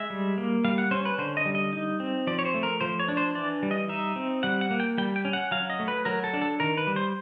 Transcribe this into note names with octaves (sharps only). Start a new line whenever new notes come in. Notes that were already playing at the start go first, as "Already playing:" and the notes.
Already playing: G#3 E5
G3
A#3
G3 F5
F#5
C#4 C5
B4
D3 C5
D#5
G3
D#5
D#4
C4
F3 D5
C#5
C5
A3
A#4
F3 C5
C#5
D4
C5
E3 D5
G3
D#5
D#4 E5
C4
G3 F#5
F#5
A#3
G5
G3 G5
G5
C#4
F#5
F#3 F5
D#5
A3
B4
F#3 A#4
A4
D4
A4
D#3 A#4
B4
G3
C5